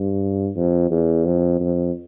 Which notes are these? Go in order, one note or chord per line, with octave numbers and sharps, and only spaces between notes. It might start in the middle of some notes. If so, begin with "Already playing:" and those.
Already playing: G2
F2
E2
F2
F2